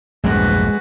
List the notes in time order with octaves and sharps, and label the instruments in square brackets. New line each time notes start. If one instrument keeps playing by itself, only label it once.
[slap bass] A#1 E2 G2 [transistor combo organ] G#3 [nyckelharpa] F#4 B4